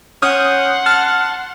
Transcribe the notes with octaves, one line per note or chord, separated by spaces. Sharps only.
C#4 F#5 C6 D#6 F6 G6
A5 F6